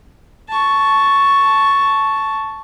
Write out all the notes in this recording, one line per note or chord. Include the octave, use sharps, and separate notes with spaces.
A5 C#6